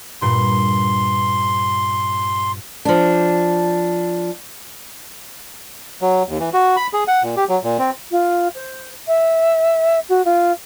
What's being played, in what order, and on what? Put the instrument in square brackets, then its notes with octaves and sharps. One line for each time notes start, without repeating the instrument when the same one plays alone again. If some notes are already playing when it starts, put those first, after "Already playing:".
[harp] G2 A#2 [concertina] C6
[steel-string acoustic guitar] F3 D4
[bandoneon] F#3
D#2
E3
F#4
B5
G#4
F#5
A#2
G4
F#3
A#2
C4
[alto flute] F4
C5
E5
F#4
F4